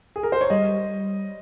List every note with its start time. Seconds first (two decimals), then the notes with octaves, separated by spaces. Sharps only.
0.16 G#4
0.23 A#4
0.32 C5
0.41 C#5
0.50 G3 D#5